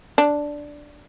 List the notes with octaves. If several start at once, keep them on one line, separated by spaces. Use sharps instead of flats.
D4